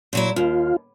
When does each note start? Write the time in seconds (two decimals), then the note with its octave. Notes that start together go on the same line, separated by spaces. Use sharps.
0.13 A#2 F#3 E4
0.36 D#2 F4